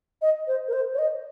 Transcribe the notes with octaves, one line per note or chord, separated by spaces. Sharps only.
D#5
C5
A#4
C5
C#5
D#5